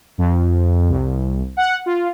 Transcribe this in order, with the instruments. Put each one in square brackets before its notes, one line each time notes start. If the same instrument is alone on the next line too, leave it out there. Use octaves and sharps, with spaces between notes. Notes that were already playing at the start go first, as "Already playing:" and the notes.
[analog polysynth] F2
C2
F#5
F4